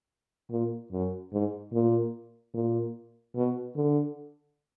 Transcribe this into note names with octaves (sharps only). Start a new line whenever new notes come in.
A#2
F#2
G#2
A#2
A#2
B2
D3